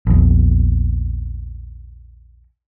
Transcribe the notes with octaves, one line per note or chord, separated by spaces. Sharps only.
A#1 E2